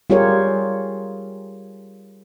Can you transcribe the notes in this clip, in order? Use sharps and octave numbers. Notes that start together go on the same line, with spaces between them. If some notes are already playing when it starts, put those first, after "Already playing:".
G3 F4 G4 G#4 A#4 C#5